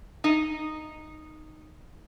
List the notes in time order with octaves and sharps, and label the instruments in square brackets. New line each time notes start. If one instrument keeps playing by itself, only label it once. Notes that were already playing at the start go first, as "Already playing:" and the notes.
[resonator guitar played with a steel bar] D#4 D#5